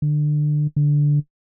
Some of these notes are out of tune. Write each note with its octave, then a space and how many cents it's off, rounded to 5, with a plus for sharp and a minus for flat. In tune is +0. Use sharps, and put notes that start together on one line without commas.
D3 +25
D3 -5